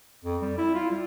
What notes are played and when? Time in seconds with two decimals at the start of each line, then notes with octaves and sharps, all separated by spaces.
0.24 F2
0.42 G3
0.58 E4
0.75 F4
0.90 G3